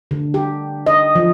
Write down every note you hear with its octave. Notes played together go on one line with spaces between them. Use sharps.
D3
G4
D#5
F3